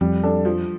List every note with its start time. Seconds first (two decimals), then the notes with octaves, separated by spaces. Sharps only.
0.01 F2 G3
0.23 D4 A4
0.45 F3